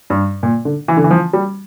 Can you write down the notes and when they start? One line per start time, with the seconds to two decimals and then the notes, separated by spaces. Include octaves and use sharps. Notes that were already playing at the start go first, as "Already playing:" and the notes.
0.10 G2
0.43 A#2
0.65 D3
0.88 E3
0.97 D3
1.04 E3
1.11 F3
1.33 G3